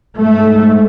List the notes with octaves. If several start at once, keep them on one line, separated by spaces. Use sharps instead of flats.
G#2 A3